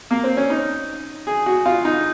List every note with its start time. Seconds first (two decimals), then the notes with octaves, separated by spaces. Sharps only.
0.11 A#3
0.24 C4
0.37 C#4
0.50 D#4
1.27 G#4
1.46 F#4
1.66 F4
1.85 D#4